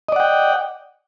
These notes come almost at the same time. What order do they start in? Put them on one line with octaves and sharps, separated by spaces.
D#5 D5 F#5 G5